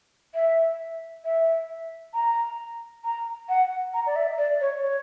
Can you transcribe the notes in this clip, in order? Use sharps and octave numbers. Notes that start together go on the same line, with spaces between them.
E5
E5
A#5
A#5
F#5
A#5
D5
E5
D5
C#5
C#5